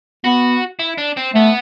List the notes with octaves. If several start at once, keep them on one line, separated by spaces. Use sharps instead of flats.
B3 F#4
E4
D4
C4
A3 B3